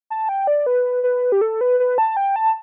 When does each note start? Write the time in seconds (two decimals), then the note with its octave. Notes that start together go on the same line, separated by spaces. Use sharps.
0.10 A5
0.29 G5
0.47 D5
0.66 B4
1.03 B4
1.32 G4
1.41 A4
1.61 B4
1.80 B4
1.98 A5
2.17 G5
2.36 A5